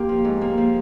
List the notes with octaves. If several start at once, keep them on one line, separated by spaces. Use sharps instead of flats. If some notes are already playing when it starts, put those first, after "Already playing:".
Already playing: A#3 F4 G4
F3
G#2
A#3
F3